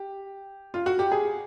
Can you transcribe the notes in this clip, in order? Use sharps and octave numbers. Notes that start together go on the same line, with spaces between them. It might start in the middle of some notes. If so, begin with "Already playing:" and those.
Already playing: G4
F4
F#4
G4
G#4